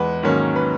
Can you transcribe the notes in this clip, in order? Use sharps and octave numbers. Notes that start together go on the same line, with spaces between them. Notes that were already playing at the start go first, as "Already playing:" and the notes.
Already playing: E2 G#3 B4 F#5
G#2 D#3 F#3 A#3 C#4
B4